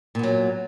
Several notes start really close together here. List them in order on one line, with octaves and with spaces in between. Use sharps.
A#2 B3 F#3